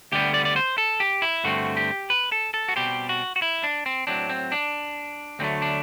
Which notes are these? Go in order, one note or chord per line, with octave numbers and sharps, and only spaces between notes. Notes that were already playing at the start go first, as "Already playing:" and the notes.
D2 D3 G3 B3 G4
D5
D5
C5
A4
G4
E4
G2 D3 A3 C4 F#4
G4
B4
A4
A4
F#4
B2 G3 C4 G4
F#4
F#4
E4
D4
C4
A2 F#3 C4 D4
C4
D4
D2 D3 F#3 A3 C4
D4